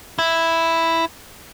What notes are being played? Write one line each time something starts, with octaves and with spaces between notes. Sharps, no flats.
E4